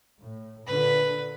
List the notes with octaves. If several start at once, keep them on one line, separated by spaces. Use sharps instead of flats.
A2
A#2 D3 B4